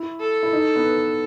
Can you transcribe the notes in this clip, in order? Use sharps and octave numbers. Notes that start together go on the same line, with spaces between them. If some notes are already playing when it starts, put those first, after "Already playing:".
Already playing: E4
A4
E4
D#4
B3